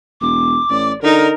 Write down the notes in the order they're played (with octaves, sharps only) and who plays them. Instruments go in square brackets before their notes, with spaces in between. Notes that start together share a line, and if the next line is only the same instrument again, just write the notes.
[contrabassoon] E1 [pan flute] D6
[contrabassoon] A1 [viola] D5
[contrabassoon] D3 [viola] D#4 A#4